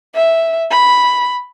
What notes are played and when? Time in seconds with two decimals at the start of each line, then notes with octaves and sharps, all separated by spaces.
0.14 E5
0.71 B5